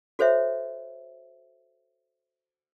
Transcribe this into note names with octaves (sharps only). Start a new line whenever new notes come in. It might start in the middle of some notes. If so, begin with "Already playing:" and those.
F#4 A4 C5 C#5 E5